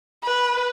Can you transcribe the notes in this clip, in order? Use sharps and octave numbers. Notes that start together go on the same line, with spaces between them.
B4